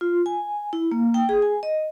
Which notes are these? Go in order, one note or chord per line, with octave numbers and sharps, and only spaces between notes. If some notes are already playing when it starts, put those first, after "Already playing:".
F4
G#5
E4
A#3
G5
G#4
G#5
D#5